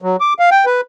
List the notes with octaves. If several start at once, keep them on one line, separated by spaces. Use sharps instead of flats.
F#3
D6
F5
G5
B4